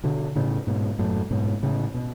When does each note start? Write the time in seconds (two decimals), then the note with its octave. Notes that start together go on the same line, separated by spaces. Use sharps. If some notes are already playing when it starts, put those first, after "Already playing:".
0.04 B2 D3
0.36 A2 C#3
0.67 G#2 B2
0.99 F#2 A2
1.31 G#2 B2
1.63 A2 C#3
1.94 B2